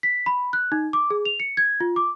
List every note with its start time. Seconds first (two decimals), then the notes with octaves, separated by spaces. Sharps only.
0.03 B6
0.26 B5
0.53 F#6
0.72 D#4
0.93 D6
1.10 G#4
1.25 F7
1.40 C#7
1.57 G#6
1.81 F4
1.96 D6